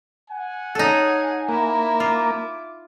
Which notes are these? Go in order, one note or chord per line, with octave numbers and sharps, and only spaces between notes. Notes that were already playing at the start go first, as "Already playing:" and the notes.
F#5 G#5
D#4 G#4 A4 C#5
A#3 E4
F4 D6